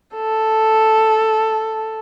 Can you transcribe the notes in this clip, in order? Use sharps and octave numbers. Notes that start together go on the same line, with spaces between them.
A4